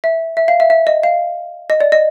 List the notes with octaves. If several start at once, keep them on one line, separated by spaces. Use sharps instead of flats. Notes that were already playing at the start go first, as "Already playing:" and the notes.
E5
E5
F5
E5
E5
D#5
F5
D#5
D5
D#5